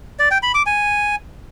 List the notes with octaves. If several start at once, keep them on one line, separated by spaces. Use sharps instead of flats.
D5
G5
B5
D6
G#5